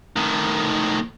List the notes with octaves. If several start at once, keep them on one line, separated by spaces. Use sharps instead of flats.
A2 D#3